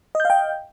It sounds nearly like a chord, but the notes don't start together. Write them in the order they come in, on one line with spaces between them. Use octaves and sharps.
D#5 G6 F5 G5